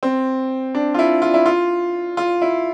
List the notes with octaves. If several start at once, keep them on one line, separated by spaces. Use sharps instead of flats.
C4
D4
F4
E4
F4
E4
F4
F4
E4